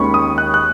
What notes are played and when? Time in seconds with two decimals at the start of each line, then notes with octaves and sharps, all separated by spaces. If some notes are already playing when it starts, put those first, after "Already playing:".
Already playing: D#2 D#3 G#3 C#4 B5 C#6
0.14 D#6
0.38 F#6
0.54 F#6